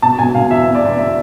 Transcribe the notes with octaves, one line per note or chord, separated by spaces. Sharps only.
B2 A5
B2 G#5
B2 F5
E2 E5
B2
D5
E2
B2 E5